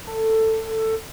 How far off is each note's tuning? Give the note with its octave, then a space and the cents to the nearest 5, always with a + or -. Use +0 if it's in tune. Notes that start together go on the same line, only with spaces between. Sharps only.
A4 +15